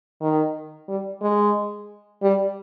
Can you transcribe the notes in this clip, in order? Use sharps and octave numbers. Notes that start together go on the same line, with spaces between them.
D#3
G3
G#3
G3